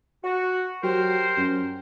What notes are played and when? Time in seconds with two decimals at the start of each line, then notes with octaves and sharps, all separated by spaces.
0.24 F#4
0.83 F#3 G4 A#4 C5
1.37 F#2